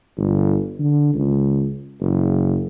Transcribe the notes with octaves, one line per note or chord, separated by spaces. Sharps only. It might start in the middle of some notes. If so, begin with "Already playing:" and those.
G1
D3
C#2
F#1